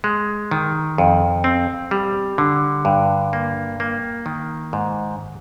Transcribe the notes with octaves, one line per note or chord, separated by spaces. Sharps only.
G#3
D#3
F2
C4
G3
D3
G2
A#3
A#3
D#3
G#2